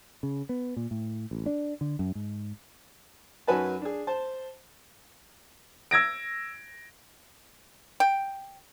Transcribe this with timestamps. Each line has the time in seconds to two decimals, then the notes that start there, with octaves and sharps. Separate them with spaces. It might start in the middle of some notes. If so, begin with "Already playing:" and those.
0.23 C#3
0.49 B3
0.77 A#2
0.91 A2
1.31 A1
1.46 D4
1.81 D3
1.99 F#2
2.15 G#2
3.47 F#2 F#3 D#4 B4 G#5 A5
3.81 D4 G#4
4.07 C5 A5
5.91 E6 G#6 A#6 D7
8.00 G5